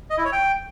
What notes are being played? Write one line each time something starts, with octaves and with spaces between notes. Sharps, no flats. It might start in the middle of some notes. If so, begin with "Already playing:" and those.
D#5
E4
C#5
G5